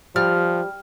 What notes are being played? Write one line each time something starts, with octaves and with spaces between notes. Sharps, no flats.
F3 G3 F6